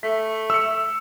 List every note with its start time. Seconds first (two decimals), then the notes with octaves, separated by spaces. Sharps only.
0.03 A3 B6
0.50 E6 C#7